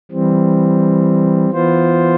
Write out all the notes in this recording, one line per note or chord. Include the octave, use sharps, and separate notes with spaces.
E3 G3 C4
E3 B3 F4 C5